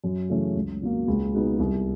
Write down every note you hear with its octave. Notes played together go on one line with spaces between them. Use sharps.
F#2
C#3 E3 A3 C#4
C#2
B2 F#3 A#3
C#2
B2 G#3 B3 D#4
C2